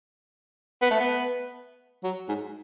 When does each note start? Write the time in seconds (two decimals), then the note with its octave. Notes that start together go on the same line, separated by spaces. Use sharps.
0.82 B3
0.91 A3
1.00 B3
2.03 F#3
2.29 G#2